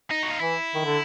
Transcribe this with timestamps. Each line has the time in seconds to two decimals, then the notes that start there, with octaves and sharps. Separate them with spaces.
0.11 D#4
0.23 F#4
0.31 F4
0.40 E3 E4
0.75 D#3
0.85 D3